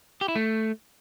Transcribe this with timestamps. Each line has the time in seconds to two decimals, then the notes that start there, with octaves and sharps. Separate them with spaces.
0.21 G4
0.28 E4
0.36 A3